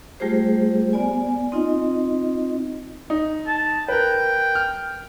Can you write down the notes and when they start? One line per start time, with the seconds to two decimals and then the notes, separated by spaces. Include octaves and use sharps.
0.20 G3 A3 F4 G4 G#4 C5
0.93 B3 D5 G#5
1.52 C4 D#4 F4 D#5
3.10 D#4
3.46 A5
3.88 A#4 B4 G5
4.55 F6